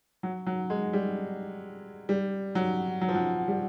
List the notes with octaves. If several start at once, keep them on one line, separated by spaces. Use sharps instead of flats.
F#3
F#3
G#3
G3
G3
F#3
F#3
F3
F#3
G3